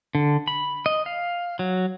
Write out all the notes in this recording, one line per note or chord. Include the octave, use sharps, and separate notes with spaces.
D3
B5
D#5
F5
F#3